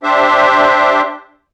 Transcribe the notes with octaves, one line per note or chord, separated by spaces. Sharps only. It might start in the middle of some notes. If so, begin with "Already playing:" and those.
D4 G4 C5 E5